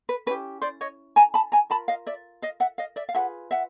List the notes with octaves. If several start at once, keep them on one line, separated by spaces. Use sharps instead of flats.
B4
C#4 E4 G4 B4
C5 D5
C#5 D#5
G#5 A#5
A5 B5
G#5 A#5
F4 A#4 A5 B5
D#5 F5
D5 E5
D#5 F5
E5 F#5
D#5 F5
D5 E5
F5
F4 G#4 B4 E5 F#5
E5 F#5